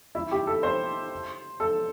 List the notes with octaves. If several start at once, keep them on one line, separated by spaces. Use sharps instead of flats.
E4
G4
A4
C5
A4